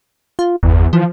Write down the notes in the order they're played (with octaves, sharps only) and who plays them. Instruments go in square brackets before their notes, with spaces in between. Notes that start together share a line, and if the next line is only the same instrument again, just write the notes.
[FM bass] F4
[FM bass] G1 [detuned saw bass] E2
[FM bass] E3 [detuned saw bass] F3